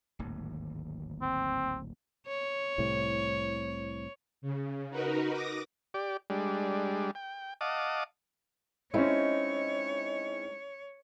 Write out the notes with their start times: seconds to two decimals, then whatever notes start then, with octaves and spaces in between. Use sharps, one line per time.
0.19 D1 G#1 D#2
1.22 C4
2.28 C#5
2.78 C2 A2 C3
4.42 C#3
4.90 D#4 F#4 A#4 B4
5.32 D6 D#6 A#6
5.94 G4 D5
6.30 G3 G#3 D4
7.15 G5
7.61 D#5 F5 F#5 A5 D6 D#6
8.94 G#3 C4 C#4 D#4 E4 C#5